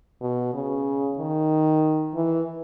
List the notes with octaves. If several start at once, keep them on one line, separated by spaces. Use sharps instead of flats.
B2
C#3
D#3
E3